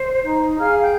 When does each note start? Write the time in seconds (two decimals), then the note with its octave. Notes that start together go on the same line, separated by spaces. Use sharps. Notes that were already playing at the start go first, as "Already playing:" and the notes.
Already playing: C5
0.24 D#4
0.59 G#4 F5 F6
0.81 G5 G6